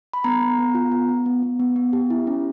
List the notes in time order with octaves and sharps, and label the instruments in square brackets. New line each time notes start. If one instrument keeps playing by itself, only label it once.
[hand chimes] B5
B3 A#5
B3
B3
F4
B3
B3
B3
B3
B3
B3
G4
E4
C#4